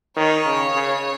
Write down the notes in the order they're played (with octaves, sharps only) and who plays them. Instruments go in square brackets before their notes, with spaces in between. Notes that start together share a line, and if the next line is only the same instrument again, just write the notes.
[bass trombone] D#3 [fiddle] C#5
[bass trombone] C#3
C#3